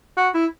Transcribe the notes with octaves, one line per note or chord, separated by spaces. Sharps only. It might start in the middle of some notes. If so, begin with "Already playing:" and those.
F#4
E4